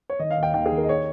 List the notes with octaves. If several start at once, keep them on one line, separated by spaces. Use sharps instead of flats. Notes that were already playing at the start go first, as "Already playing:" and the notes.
C#5
D#3 D#5
F5
D#2
G5
D#2 G5
G#4
D#3
A#4
D#5
C#5